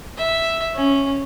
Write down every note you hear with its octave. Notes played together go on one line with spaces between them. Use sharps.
E5
C#4